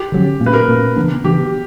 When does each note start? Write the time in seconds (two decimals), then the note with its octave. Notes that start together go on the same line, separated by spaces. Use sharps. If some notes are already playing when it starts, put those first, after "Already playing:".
Already playing: G4
0.12 D3 F#3 C#4
0.40 A#2 A#3 C#4
0.46 B4
0.53 A#4
0.68 A#2 A#3 C#4
0.96 C#3 E3 B3 D4
1.24 C#3 E3 B3 D4 G4